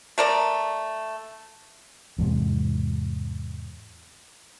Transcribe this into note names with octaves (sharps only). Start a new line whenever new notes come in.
A3 A#4 D5
E2 G#2 C3